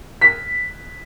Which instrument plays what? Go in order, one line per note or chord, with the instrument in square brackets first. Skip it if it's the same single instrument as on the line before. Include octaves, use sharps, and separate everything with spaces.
[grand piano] B6